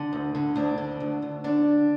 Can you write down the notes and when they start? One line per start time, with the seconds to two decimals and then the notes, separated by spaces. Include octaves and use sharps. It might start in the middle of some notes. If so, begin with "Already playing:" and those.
Already playing: D3
0.13 D2
0.35 D3
0.56 D2 D4
0.78 D3
1.00 D2
1.22 D2
1.44 D3 D4